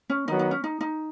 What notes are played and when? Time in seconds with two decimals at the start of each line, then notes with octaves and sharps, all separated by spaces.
0.10 C#4
0.27 D#3 F#3 B3 D#4
0.39 D#4
0.51 C#4
0.64 D#4
0.81 D#4